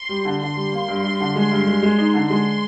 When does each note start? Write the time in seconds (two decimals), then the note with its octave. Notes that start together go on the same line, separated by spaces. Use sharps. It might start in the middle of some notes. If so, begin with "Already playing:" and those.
Already playing: C6
0.09 G3
0.25 D3
0.41 D3 C6
0.56 G3
0.72 A#3
0.88 G2
1.04 G2
1.20 D3
1.36 G#3
1.52 G2
1.67 G#3
1.83 G#3
1.98 D#4
2.14 D3
2.30 G#3 C6